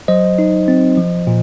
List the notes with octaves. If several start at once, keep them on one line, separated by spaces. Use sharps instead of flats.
F#3 C5 D#5
D#4
C4
F3
A#2